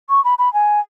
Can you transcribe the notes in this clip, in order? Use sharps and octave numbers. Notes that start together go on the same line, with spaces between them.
C#6
B5
B5
G#5